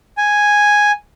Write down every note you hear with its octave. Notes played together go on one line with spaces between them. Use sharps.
G#5